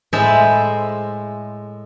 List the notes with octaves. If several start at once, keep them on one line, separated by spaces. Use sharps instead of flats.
A2 G#3 C5 E5 A5 B5